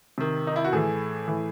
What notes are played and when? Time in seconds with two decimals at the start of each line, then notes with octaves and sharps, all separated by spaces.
0.18 C3 D#3
0.47 D#4
0.56 E4
0.64 F#4
0.73 A2 E3 G#4
1.28 A2 E3